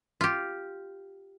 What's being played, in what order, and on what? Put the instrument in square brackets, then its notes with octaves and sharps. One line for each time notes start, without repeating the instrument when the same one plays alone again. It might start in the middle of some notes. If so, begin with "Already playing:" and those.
[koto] F4 G4